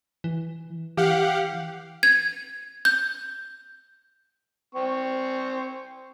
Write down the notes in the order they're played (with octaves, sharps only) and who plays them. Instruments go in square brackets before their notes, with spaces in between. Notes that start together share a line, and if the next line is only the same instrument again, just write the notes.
[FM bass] E3
[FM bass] E3 [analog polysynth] G4 F5 F#5
[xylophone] G#6
G6
[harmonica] C4 C#6